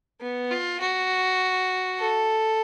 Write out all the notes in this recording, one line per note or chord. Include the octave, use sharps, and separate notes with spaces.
B3
F4
F#4
A4